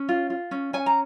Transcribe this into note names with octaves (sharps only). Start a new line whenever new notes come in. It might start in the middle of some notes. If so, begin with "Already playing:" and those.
Already playing: C#4
F4
F4
C#4
C#4 G#5
A#5